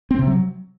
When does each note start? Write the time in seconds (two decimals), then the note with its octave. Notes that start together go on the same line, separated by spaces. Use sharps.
0.11 C4
0.19 C3
0.27 F#3